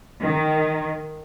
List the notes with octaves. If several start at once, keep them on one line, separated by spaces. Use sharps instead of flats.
D#3